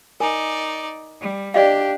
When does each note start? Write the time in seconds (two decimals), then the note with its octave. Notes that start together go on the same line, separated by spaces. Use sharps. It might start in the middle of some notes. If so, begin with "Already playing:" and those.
0.20 D#4 A#4 D5 G#5
1.21 G3
1.54 D4 G4 D5 D#5 F5